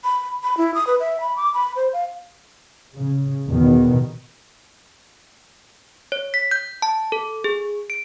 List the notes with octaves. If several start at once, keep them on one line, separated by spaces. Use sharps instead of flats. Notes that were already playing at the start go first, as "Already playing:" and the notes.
B5
B5
E4
D#6
B4
E5
B5
D6
B5
C5
F5
C#3
E2 B2 D#3
C#5
B6
G6
A5
A4
G#4
D7